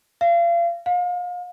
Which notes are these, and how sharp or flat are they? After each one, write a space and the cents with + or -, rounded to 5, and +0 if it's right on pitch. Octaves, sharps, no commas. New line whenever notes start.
F5 -35
F5 +35